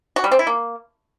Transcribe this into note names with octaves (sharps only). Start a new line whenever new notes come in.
F#4
G3
C4
E4
A#3